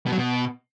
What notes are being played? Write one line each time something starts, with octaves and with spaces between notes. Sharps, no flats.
B2
F#3
B2